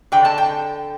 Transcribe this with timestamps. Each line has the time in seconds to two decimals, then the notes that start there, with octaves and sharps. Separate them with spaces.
0.12 D3 G5
0.25 A5
0.38 G5